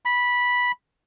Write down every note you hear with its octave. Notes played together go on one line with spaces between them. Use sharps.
B5